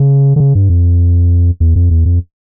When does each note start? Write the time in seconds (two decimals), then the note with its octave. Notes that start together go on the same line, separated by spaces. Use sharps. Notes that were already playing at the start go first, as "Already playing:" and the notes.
Already playing: C#3
0.36 D3
0.40 C#3
0.55 G2
0.70 F2
1.60 E2
1.76 F2
1.91 E2
2.05 F2